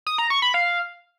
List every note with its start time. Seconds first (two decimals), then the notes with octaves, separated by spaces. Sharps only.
0.07 D#6
0.18 A#5
0.30 C#6
0.42 B5
0.54 F5